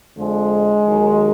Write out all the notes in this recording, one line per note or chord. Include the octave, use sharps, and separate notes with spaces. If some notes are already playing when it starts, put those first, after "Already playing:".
F2 D3 F3 G#3
D#2 D#3 F#3